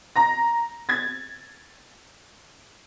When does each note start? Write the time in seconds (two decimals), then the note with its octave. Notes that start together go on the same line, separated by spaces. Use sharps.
0.16 A#5 A#6
0.89 G#6 A6